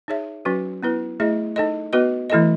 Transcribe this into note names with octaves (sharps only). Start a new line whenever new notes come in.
D#4 G#4 C#5 E5
F#3 C#4 F#4 B4
B3 E4 B4
A3 E4 G#4 D#5
D#4 A4 D#5
B3 F#4 B4 D#5
E3 A3 E4 A4 D#5